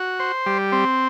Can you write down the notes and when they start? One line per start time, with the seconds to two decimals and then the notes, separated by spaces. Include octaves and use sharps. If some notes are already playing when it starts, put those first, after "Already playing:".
Already playing: F#4
0.20 C5
0.46 G3
0.72 C4